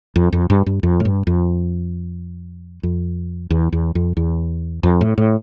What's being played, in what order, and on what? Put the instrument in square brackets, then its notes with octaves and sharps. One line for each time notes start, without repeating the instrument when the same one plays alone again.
[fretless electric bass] F2
F2
G2
G2
F2
A2
G2
F2
F2
E2
E2
F2
E2
F2
A2
A2